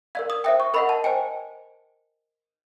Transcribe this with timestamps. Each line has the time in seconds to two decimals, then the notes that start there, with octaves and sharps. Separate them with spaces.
0.15 A#4 D5 F5 G#6
0.30 D#6
0.44 C5 E5 G5 D#6
0.60 C#6
0.74 A#4 D#5 F#5 B5
0.89 A5
1.04 C5 D#5 G5 G#5